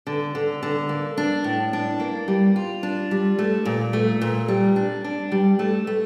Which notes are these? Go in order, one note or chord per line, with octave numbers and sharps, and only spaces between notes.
D3
D3
D3
A#3
D4
A2
D4
A#3
G3
F4
D4
G3
A3
A#2
A3
A#2
G3
D4
D4
G3
A3
A3